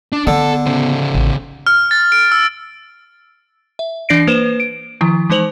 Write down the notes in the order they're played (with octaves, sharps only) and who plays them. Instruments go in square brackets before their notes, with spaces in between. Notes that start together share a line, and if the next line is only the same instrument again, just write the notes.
[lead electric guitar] D4
[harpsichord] D3 [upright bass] B3 [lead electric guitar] A4
[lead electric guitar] C#3 C5
[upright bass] A1
[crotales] F6
A6
D7
E6
[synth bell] E5
E3 D4 D5 A#6 C7 D7
A#3 B4 C5 E7
D7
D#3 F3 E4
E3 G#3 D#4 C5 F7 F#7